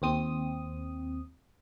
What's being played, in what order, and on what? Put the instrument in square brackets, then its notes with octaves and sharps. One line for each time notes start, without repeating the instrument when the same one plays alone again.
[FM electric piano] D#2 C4 D#6